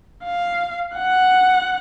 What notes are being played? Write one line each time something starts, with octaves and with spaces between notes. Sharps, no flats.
F5
F#5